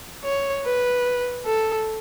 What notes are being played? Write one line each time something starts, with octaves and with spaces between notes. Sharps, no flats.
C#5
B4
A4